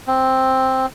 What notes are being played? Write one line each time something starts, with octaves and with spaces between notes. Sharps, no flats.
C4